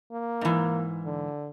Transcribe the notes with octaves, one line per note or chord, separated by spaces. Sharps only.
A#3
G#2 E3
D3